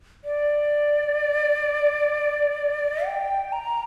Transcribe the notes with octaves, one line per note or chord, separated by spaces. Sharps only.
D5
G5
A#5